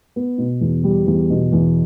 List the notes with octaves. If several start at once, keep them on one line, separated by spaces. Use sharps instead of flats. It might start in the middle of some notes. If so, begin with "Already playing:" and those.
B3
B2
E2
G3
E2
B2
E2